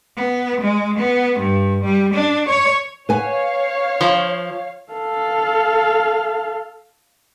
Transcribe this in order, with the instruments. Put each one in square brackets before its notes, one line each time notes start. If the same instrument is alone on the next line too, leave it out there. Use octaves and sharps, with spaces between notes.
[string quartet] B3
G#3
B3
G2
G3
D4
C#5
[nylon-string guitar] B4 G#5 [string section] C#5 F5
[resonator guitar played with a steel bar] F3
[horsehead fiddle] A4 F5